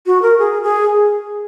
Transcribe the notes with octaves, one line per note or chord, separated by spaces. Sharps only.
F#4
A#4
G#4
G#4